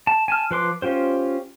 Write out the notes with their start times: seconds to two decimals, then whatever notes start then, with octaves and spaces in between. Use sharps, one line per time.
0.07 A5
0.28 G#5 A5 F6
0.51 F3 B4 C6 D6
0.82 C#4 F4 G4 C5